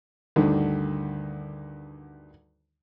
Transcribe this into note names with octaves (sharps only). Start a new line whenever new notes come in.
D2 G2 D3 D#3